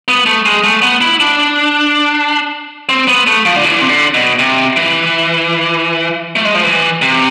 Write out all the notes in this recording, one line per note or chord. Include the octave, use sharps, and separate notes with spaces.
B3
A3
G#3
A3
B3
E4
D4
C4
B3
A3
F3
D3
E3
C3
D3
B2
C3
E3
A3
G#3
F3
E3
C3